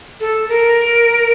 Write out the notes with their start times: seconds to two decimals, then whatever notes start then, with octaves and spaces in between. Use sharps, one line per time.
0.20 A4
0.49 A#4